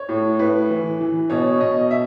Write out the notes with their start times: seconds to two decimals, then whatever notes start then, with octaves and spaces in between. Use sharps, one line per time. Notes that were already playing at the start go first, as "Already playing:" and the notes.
Already playing: C#5
0.09 A2
0.39 A2 B4
0.70 E3
1.00 E3
1.30 B2 C#5
1.60 B2 D#5
1.91 E5